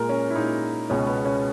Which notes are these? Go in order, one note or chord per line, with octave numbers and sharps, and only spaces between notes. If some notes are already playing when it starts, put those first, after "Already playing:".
Already playing: A#2 G#3 A#4
C#4
E4
A#2 G#3 D#4
C#2 B2 G#3 C#4
B3
C#4